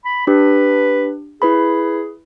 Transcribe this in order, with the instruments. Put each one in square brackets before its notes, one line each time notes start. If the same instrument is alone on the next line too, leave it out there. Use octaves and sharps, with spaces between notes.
[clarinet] B5
[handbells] D4 G4 [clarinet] B4
[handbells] E4 B4 B5 [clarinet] G#4